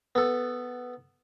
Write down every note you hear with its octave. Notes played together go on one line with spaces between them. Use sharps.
B3 A4